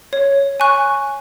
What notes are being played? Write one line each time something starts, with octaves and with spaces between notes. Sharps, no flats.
C#5
G#5 C#6 F#6